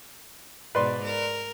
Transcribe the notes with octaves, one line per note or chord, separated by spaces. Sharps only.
G#2 B2 B4 D5 C6
A#4